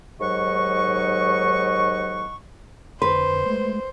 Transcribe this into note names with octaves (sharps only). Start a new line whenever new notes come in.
D#2 G#2 F#3 D#5 F#5 C#6
F2 D3 B4 C5 C6
G#3 A3